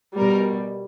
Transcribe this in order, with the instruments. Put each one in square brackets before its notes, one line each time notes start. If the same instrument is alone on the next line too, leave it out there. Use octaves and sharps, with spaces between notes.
[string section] B2 G3 A#4